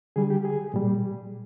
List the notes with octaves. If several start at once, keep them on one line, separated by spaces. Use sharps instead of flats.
D3 G3 G#4
G4
G#4
A#2 G3